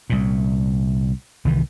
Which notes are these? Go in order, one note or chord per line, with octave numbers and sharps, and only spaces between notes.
C2 A#2
C2 D#3 E3